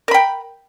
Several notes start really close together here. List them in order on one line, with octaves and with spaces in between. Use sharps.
A#4 B5 G5